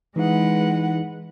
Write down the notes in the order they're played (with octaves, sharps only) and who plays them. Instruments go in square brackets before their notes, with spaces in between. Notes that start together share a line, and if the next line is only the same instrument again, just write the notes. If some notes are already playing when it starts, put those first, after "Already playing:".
[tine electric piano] E3 D#4 E4 [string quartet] G#3 B4 F#5